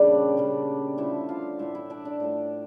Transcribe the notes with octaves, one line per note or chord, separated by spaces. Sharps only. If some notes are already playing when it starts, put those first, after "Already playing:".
Already playing: A#2 C#3 G3 A3 D4 D5
C#3 G3
D3 F3 A3 E4 E5
F4 F5
A2 E3 A3 E4 E5
E4 E5
D4 D5
D4 D5
A2 F3 A3